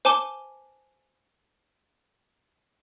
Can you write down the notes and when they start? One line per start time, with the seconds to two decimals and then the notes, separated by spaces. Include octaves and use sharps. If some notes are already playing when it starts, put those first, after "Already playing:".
0.05 C5 G#5 A5 D6 G7